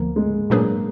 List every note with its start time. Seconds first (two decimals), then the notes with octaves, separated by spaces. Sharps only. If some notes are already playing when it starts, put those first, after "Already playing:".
Already playing: D2 D3 F3 A#3 B3
0.16 G#3
0.50 A#2 F#3 A#3 D4 G#4 B4